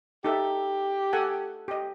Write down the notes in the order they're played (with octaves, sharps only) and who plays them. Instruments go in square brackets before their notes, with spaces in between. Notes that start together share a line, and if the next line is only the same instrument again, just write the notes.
[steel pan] D#4 A4 E5 [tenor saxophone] G4
[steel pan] A4 F#5 G#5
G4 D#5